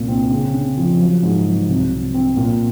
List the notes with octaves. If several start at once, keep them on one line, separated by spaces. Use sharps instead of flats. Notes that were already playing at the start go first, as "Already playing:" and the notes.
Already playing: C2 A#2
C4
C#3
C#3
F3
F#3
G#2
F#3
C2
C3
C4
A#2